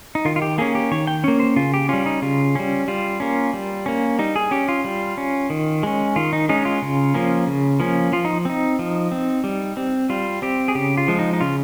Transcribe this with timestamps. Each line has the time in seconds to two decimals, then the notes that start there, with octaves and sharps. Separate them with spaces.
0.15 D#4
0.25 D#3 F4
0.36 F4
0.42 G4
0.58 A#3 C#4 G#4
0.75 G4
0.91 D#3 C#5
1.07 G5
1.24 A#3 C#4 C#5
1.40 C5
1.56 C#3 F4
1.74 G4
1.89 G3 C#4 F4
2.06 D#4
2.22 C#3 F4
2.55 G3 C#4
2.88 G3 F4
3.20 A#3 C#4
3.53 G3
3.86 A#3 C#4
4.19 G3 D#4
4.36 G#4
4.51 C#4 G4
4.68 F4
4.84 G3
5.18 C#4
5.50 D#3
5.83 G#3 C#4
6.16 D#3 F4
6.33 D#4
6.49 G#3 C#4 D#4
6.65 F4
6.82 C#3
7.14 F3 A#3 C#4
7.47 C#3
7.80 F3 A#3 C#4
8.13 F3 F4
8.25 D#4
8.45 C4 D#4
8.79 F3
9.12 C4
9.44 G3
9.77 C4
10.10 G3 F4
10.42 C4 G4
10.68 G#4
10.75 C#3 G4
10.97 F4
11.08 F3 G#3
11.19 D#4
11.33 D#4
11.41 C#3 F4